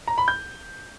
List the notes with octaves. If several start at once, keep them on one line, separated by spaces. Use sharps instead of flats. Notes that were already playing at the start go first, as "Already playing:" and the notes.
A#5
B5
G6